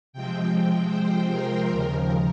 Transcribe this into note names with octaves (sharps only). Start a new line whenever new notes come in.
C3 F3 G#3 C4 G5
C5
A#4
D#2 C#3 F3